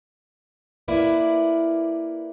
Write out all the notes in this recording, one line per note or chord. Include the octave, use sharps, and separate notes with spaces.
A#3 E4 B4 D5